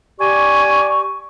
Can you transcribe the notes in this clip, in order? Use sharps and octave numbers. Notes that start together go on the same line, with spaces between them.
G4 D5 G#5 C#6